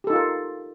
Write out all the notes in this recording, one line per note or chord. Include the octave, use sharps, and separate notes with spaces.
D#4 F4 G4 A4 A#4